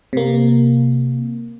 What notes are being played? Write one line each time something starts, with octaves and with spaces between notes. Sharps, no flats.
C3 A#3